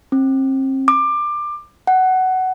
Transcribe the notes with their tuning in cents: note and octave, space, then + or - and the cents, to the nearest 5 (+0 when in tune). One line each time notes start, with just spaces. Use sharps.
C4 +35
D6 +20
F#5 +15